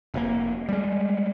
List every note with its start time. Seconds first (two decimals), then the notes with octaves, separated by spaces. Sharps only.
0.14 F1 A#2 A#3
0.69 G3 G#3